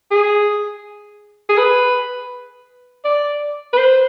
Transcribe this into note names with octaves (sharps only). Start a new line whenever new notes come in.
G#4
G#4
B4
D5
B4
C5